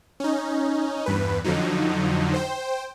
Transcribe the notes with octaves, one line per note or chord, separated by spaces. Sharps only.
C#4 D#4
E2 G2 B4
F2 D3 F3 F#3 D#4
C5 G5